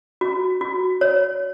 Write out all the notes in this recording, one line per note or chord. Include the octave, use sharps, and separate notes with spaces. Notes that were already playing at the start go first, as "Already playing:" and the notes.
F#4
F#4
C#5